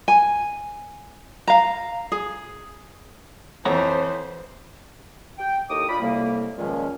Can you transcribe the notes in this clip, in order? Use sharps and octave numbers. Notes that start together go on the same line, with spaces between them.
G#5
F5 A#5
G#4
F2 E3 C5 C#5 F#5 A#5
G5
D#2 A2 D#5 D6 D#6
D4 F4 D5 B5
C2 A2 C3 G3 A#3
C#2 A#2 D#3 F3 G#3 C#4